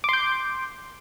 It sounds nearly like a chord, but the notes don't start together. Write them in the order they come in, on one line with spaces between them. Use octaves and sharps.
D6 C6 G6